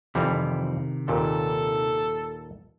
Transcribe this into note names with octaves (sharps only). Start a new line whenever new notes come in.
F2 C3 D#3 E3 G3
D#2 A#2 A4